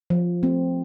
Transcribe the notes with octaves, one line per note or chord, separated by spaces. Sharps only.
F3
A3 C4